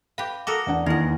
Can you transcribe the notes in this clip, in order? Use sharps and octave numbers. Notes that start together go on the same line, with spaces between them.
G4 B4 F5
F#4 A4 A#4 D6 D#6
E2 D4 F#5
D#2 D#4 E4 A#4 D#5